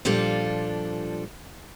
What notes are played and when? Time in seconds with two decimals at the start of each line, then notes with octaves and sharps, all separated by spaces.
0.05 A#2 F3 G3 D4 A4